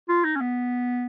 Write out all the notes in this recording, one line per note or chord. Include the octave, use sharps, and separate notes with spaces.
F4
D#4
C#4
B3